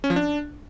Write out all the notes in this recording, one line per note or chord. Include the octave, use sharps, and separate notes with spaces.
C#4
F3
D4